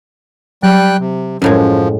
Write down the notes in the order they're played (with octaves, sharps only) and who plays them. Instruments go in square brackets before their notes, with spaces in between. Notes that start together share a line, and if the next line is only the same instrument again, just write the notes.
[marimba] F#3 [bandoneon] G3 G5 F#6
[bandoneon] C3
[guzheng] F#2 A2 G#3 [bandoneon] F3 [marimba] C#4